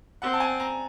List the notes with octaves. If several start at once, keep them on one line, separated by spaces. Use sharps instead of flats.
C4 F#5
A5
G#5
A#5